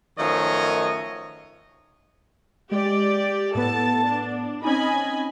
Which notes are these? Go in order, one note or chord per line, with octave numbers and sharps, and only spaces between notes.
F#2 D#3 F3 A3 C#5 D#5
G#3 G4 D5
A2 B3 A4 A5
D4
C4 C#4 D#4 D#5 G#5 B5